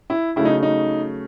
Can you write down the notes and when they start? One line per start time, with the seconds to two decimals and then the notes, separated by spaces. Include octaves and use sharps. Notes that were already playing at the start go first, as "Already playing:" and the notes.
0.10 E4
0.36 C#3 F#3 A3 E4
0.45 D#4
0.62 D#4